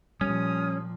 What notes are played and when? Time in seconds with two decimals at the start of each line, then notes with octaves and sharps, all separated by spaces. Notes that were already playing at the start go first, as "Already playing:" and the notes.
0.21 A#2 F3 G3 C#4 D#6